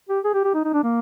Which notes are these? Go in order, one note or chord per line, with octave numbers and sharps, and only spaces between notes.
G4
G#4
G4
G4
D#4
D#4
D4
A#3